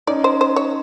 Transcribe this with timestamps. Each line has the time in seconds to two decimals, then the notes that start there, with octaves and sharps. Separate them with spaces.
0.07 C#4 D#4 D5
0.24 C5
0.41 C5
0.56 C#5